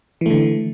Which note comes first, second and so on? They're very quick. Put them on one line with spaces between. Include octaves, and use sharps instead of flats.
E3 A3 D3